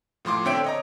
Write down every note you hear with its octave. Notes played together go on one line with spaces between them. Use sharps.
A2 F3 C6 D6
D3 C4 C#5 E5 G5 D7
C#5 D#5 A#5